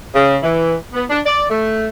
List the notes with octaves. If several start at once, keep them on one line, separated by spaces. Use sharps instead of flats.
C#3
E3
B3
D4
D5
A3